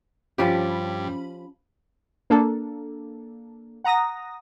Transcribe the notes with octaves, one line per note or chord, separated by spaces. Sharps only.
G2 F3 G3 C#4 G4 B5
A#3 D4 A4
F#5 A#5 D#6 A#6